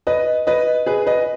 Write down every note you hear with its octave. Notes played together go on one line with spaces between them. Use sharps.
B4 D#5
B4 D#5
G#4 B4
B4 D#5